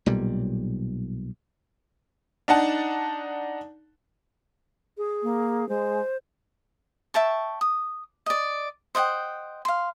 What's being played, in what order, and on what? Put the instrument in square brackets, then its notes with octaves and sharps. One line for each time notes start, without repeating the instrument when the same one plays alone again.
[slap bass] B1 A#2 G3
[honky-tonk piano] D4 D#4 F#5 A5
[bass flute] G#4
[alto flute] A#3
[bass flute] G#3 [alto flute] C5
[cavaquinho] E5 G5 A5 C#6
D#6
D5 D#5
C5 D#5 F#5 G5
F5 C6